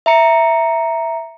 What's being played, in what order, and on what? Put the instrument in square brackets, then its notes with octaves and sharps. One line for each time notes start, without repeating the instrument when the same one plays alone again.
[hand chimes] E5 A#5 C#7